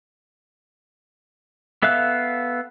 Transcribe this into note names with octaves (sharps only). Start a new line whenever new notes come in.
B3 A4 E5 F5 F#6